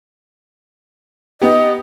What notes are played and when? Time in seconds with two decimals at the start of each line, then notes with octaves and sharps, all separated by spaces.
1.42 B3 D#4 G4 D#5